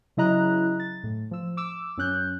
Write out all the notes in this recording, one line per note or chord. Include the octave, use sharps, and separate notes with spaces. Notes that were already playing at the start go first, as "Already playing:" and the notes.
C#3 F#3 E4 D#5 A#5 F#6
A6
A2
F3 E6
D6 E6
F#2 C#4 F#6 G6